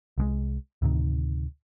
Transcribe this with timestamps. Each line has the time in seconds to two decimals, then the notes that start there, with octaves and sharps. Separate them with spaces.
0.18 C2 F3 G#3
0.82 D2 A2 C3 D#3